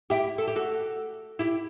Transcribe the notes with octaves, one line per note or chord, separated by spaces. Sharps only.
E4 G4
A4
G4
F#4 A4
E4 G4